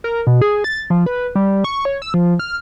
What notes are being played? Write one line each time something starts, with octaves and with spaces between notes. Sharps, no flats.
A#4
B2
G#4
A6
F3
B4
G3
C#6
C#5
E6
F3
F6